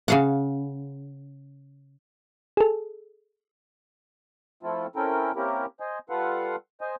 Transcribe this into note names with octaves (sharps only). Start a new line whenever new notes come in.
C#3 F5 F#5
G#4 A4
F3 A3 C4 E4 F4 A4
C4 C#4 E4 A4 A#4 G5
A#3 C4 C#4 E4 G4 A#4
C5 D#5 G#5
G3 F4 A4 B4 F5 F#5
C5 D#5 G#5